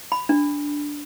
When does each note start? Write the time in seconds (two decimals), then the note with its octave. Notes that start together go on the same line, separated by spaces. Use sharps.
0.12 B5
0.29 D4